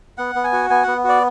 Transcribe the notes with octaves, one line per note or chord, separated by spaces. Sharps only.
B3 F#5
B3
G#5
F#4
B3 G#5
B3 F#5
F#4 D5